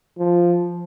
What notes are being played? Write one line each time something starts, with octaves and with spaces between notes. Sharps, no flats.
F3